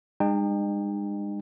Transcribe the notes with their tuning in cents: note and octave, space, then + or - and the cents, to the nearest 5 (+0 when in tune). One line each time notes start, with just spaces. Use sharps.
G#3 -35 D#4 -40 G5 +30